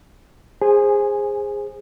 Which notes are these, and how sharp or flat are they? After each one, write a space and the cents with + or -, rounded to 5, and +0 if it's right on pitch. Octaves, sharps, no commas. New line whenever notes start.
G#4 -20 C5 +15 G#5 +0